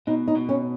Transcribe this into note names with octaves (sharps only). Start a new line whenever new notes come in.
B2 D#4
D#4
B2
C#4